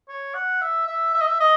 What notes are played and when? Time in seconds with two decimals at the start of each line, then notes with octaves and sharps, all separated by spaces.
0.08 C#5
0.34 F#5
0.61 E5
0.87 E5
1.14 E5
1.20 D#5
1.27 E5
1.40 D#5